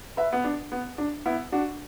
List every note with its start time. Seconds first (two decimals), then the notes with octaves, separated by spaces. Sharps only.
0.17 B4 E5
0.33 B3
0.44 D4
0.72 B3
0.98 D4
1.26 B3 E4
1.52 D4 F#4